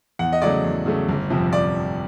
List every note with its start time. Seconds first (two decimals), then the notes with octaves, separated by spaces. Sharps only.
0.19 E2 F#5
0.33 D#5
0.42 C#3 F#3 A3 D5
0.64 E2
0.86 C#3 F#3 A3
1.09 G1
1.30 F2 C3 F3
1.53 D5